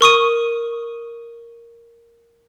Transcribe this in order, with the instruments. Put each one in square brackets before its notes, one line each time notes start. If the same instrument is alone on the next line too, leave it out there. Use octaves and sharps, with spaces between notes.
[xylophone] A#4 C#6 D#6 D#7